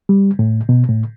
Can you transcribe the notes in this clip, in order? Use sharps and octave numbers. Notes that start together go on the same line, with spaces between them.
G3
A2
B2
A2